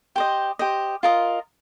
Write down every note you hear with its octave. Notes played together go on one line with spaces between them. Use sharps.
G4 C5 D#5
G4 C5 D#5
F4 A#4 D#5